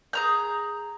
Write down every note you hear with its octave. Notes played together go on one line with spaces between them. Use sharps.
G#4 A#5 G6